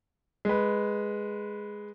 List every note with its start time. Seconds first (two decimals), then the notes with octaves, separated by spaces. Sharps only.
0.45 G#3 B4